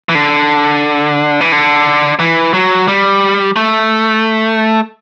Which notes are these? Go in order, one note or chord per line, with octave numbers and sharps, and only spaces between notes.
E3
D3
E3
D3
E3
F#3
G3
A3